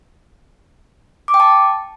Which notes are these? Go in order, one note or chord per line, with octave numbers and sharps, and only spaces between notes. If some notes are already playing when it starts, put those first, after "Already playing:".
D6
G5
A5